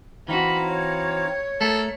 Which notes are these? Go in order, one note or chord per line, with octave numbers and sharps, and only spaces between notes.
E3 C4 D#4 F#4 F5 A#5 B5
C#5
A3 A4 A#4